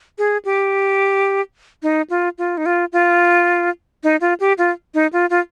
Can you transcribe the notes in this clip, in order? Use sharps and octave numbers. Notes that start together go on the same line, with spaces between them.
G#4
G4
D#4
F4
F4
D#4
F4
F4
D#4
F4
G4
F4
D#4
F4
F4